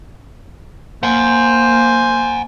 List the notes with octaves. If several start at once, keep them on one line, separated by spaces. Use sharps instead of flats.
A#3 C5 F#5 G#5